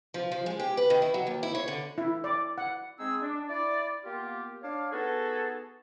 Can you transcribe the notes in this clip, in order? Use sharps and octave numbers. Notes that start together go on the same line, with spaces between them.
F3
F3
G#3
G4
B4
D#3
E4
F#3
D#2
E4
C#5
D3
E4
D5
F#5
G#3 C4 D#4 G#4 E6
D4
E4 D5
A#3 B3 F4 G4
D4 C#5 F5
B3 D#4 F#4 G#4 A4